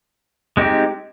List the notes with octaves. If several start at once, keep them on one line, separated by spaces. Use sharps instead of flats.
G#3 C4 D#4 G4